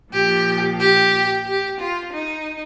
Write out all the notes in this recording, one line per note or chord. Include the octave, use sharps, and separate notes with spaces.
A#2 F3 G4
G4
G4
F4
D#4